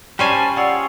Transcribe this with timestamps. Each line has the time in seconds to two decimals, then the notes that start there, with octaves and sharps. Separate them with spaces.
0.19 G3 C#4 G4 C5 G#5 A5
0.56 F4 G#4 C#5 D5 F#5 E6